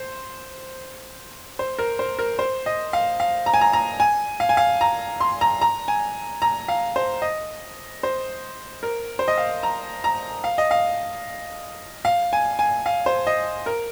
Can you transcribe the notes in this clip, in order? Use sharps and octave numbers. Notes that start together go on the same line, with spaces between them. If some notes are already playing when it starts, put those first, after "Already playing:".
Already playing: C5
C5
A#4
C5
A#4
C5
D#5
F5
F5
A#5
G#5
A#5
A#5
G#5
F5
G#5
F5
A#5
C6
A#5
A#5
G#5
A#5
F5
C5
D#5
C5
A#4
C5
D#5
F5
A#5
A#5
F5
D#5
F5
F5
G#5
G#5
F5
C5
D#5
A#4